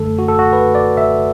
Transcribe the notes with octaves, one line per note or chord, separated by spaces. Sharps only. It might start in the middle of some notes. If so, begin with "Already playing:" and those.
Already playing: F#2 D3 A3 A4
F#4
A4
F#4
B4
D5
E5